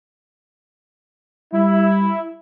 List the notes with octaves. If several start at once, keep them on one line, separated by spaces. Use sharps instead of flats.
G3 E4